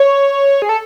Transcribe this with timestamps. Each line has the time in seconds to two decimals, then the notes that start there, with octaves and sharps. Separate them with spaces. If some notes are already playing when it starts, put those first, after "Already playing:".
Already playing: C#5
0.62 G#4
0.69 A4